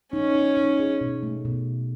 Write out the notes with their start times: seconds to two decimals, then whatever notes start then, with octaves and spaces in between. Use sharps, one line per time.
0.13 C#4 D#4
0.35 D#4
0.57 D#4
0.79 G#4
1.01 B2
1.23 A3
1.45 B2